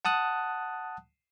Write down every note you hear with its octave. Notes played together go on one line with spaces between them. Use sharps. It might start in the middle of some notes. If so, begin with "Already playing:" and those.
F#5 A5 D#6 F#6